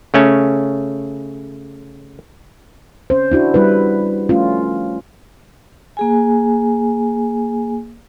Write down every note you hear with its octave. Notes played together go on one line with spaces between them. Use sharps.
C#3 A3 C#4
C#4 C5
D4 E4 F#4
G3 E4 G4 B4
A3 C#4 F4
A#3 G#4 G#5